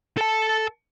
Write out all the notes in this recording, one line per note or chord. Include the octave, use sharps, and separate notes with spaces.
A4 A5